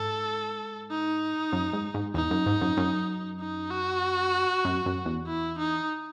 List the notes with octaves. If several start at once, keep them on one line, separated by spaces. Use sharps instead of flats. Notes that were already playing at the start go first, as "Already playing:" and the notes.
Already playing: G#2 A4
D#4
F#2
G#2
G#2
E2 D#4
F#2
G#2
F#2
F#2
D#4
F#4
F#2
F#2
E2
E4
D#4